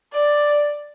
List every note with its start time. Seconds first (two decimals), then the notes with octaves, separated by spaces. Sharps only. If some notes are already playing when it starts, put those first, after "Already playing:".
0.13 D5